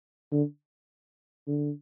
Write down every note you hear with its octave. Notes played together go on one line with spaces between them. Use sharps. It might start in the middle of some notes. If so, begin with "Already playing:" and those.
D3
D3